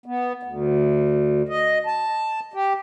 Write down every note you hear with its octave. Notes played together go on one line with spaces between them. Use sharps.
B3
D2
D#5
A5
G4